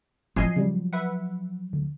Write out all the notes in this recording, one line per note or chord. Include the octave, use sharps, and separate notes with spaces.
F3 F#3 D#5 G#5 C7
C#3 G3
B4 E5 F#5
D2